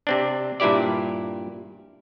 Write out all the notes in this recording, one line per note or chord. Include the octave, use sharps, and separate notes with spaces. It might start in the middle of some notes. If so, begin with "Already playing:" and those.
C3 C4 D4
G2 A#2 E4 G4 D5